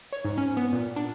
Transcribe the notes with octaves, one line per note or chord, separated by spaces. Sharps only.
C#5
G#2
C#4
B3
A#2
D4